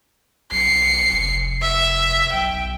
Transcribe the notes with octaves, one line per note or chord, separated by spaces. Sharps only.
B1 C7 C#7
F1
E5
B1 G5